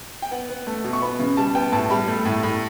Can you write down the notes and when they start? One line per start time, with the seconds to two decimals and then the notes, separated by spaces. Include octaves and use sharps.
0.22 G5
0.31 B3 F#5
0.49 B3
0.67 A3
0.84 B2
0.93 C#6
1.02 B3 B5
1.19 C#3
1.37 G3 A5
1.55 B3 G5
1.72 A2 A5
1.90 G3 B5
2.08 A3
2.25 A2
2.43 A2